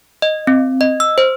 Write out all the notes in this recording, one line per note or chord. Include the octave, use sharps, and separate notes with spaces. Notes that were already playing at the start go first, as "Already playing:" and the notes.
D#5
C4
D#5
E6
C5